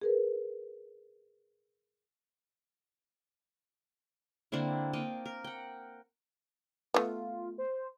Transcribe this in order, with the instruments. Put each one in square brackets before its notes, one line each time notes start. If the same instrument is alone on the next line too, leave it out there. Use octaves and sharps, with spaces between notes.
[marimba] G#4 A#4 B4
[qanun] D3 A#3 C4 E4
A#3 D#5 G5 A5
A#4
F#5 G5
[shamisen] A3 B3 [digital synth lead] F4
[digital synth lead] C5